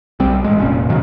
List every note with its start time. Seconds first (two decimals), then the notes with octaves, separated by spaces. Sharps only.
0.20 B1 G3 C4
0.44 A1 G#3
0.59 F1 A#2 C#4
0.89 G2 C3 D#3 F#3